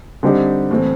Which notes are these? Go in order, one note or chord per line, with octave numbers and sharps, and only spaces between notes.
D3 G3 C4 D#4 G4
A2 E3 A3 C4